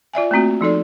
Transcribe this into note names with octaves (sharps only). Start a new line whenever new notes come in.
F4 D5 E5 G#5
A3 A#3 C4 F#4
F3 D#4 A4 D5